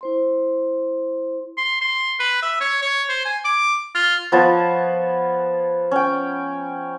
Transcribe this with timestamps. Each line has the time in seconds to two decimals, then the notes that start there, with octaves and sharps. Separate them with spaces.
0.01 E4 C5 C6
1.57 C6
1.82 C6
2.19 B4
2.43 E5
2.61 C#5
2.82 C#5
3.09 C5
3.25 G#5
3.45 D6
3.95 F4
4.32 F3 B3 C#5 A5
5.91 C#4 G5